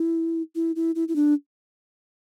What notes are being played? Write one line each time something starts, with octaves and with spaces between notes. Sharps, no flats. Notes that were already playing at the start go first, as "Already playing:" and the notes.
Already playing: E4
E4
E4
E4
E4
D4